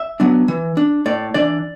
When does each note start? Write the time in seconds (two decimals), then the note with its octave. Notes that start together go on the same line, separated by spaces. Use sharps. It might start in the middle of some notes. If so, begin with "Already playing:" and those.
Already playing: E5
0.20 F#3 B3 D4
0.48 E3
0.77 D4
1.06 A2 D5
1.34 E3 D4 D5